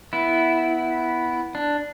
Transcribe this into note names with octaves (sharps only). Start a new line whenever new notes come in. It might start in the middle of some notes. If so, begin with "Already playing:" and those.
B3 E4
D4